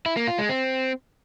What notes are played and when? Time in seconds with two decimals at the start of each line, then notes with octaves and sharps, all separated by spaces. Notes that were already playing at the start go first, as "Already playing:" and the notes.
0.06 E4
0.17 A#3
0.28 F4
0.38 G#3
0.49 C4